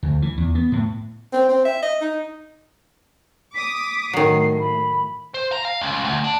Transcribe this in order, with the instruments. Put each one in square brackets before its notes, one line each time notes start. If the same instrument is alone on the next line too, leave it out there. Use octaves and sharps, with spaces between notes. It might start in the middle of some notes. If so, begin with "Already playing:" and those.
[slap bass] D2
E3
E2
B3
A2
[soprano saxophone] C4
C4
E5
D#5
D#4
[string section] D6 D#6 [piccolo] B6
[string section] A2 [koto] D#3 F#3 [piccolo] C7
[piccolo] B5
[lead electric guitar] C5
A#5
F5
C#2
D2
D4